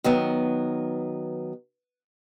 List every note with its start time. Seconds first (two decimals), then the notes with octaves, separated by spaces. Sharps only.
0.04 D#3 F#3 B3